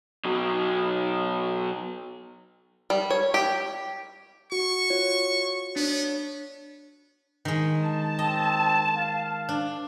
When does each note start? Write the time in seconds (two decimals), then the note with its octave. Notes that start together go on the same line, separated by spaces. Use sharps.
0.25 B2 F#3
2.90 G3
3.11 C#5
3.34 G4
4.52 F#4 C#6
4.90 F4 F#4 C#5
5.76 B3 D4 C#5
7.45 D#3 G#3
7.85 A5
8.19 C4 D#5
8.97 F5
9.49 D4